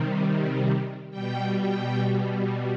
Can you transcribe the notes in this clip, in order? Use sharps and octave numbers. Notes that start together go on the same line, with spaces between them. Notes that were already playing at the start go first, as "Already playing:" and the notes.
Already playing: C3 D#3 G3
B2 G3 G5
G5